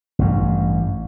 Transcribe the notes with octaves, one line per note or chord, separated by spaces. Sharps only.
A1 G2